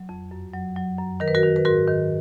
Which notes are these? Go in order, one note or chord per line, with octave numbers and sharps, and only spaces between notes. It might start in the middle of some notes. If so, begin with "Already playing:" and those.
Already playing: F#3
F2
F#2
F#3
F#3
F#2
D#3 A#4
B4
F#4 A#4
D#3
B4
G#2 F#4 A#4
D#3